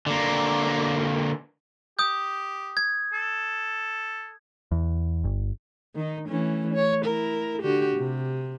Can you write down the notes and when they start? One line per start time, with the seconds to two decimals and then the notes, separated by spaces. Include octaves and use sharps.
0.06 D3 A#3
1.99 G4 D#6 G6
2.77 G#6
3.13 A4
4.72 E2
5.24 G1
5.95 D#3 D#4
6.28 E3 A3 C#4
6.74 C#5
7.04 E4 A#4
7.62 D3 F#4 G4
7.97 C3